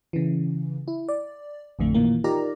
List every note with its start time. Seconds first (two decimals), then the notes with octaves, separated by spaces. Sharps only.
0.13 C#3 E3
0.88 E4
1.09 D5
1.79 A1 F2 D3 A3
1.94 A#2 D#3 E3 A#3
2.24 D#4 F4 G4 A#4 D5 A#5